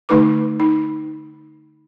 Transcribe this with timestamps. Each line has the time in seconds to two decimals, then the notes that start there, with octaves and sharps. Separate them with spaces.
0.09 D3 A3 D#4 B4 D6
0.60 D#4